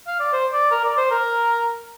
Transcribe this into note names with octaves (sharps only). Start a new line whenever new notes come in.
F5
D5
C5
D5
A#4
D5
C5
A#4